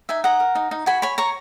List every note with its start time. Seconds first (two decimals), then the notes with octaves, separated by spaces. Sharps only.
0.09 D#4 E5 G#5
0.24 D#5 F#5 A#5
0.40 A#4
0.55 D#4
0.71 D#4
0.86 F#4 G#5 B5
1.02 C#5 G#5 B5
1.18 C#5 A#5 C#6